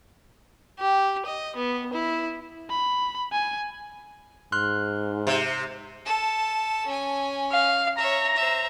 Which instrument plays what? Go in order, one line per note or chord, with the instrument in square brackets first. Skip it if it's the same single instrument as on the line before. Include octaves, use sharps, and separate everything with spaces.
[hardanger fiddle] G4
D#5
B3
E4
[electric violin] B5
G#5
[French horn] G#2 [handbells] C6 F6 F#6
[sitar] C3
[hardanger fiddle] A4 A5
C#4 G#5
[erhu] F5
[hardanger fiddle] C#5 E5 [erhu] A#5
[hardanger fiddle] C5 E5